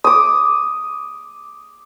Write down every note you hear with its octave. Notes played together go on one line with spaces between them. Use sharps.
D6 D#6